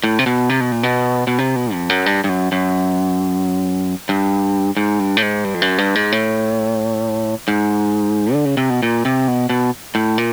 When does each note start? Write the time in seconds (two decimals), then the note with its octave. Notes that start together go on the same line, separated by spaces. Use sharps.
0.04 A2
0.19 C3
0.26 B2
0.49 C3
0.60 B2
0.72 A#2
0.83 B2
1.27 B2
1.38 C3
1.56 B2
1.73 F2
1.89 F#2
2.06 G2
2.24 G2
2.29 F#2
2.52 F#2
4.09 G2
4.77 G#2
4.99 G2
5.17 A2
5.22 G#2
5.44 G2
5.54 F2
5.62 F#2
5.78 G2
5.95 G#2
6.12 A2
7.48 G#2
8.33 D3
8.45 C#3
8.57 C3
8.70 B2
8.83 A#2
9.05 C3
9.28 B2
9.50 B2
9.95 A2
10.18 A#2